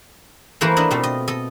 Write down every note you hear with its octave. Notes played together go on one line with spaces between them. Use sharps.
E3 A3 A#3 E4 A#4 C5
D4 E4 D#5
B2 A3 C4 F4
D#5
A4 D#5